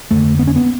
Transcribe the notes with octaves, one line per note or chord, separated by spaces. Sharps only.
F2 D3 A3
B3
C#4
B3